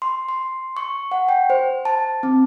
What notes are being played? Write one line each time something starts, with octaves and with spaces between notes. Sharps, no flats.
C6
C6
C#6
F#5
G5
C5
A5
C4